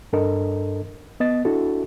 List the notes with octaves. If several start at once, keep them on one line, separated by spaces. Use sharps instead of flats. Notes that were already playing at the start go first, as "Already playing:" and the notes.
G2 D4 A4 A#4 D#5
B3 D#5 A6
D4 E4 F#4 A4